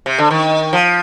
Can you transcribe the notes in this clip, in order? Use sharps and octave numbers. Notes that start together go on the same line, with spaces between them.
C3
D3
D#3
F3